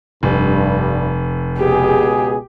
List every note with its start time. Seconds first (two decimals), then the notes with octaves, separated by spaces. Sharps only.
0.23 F1 G2
1.58 C#2 B2 G4 G#4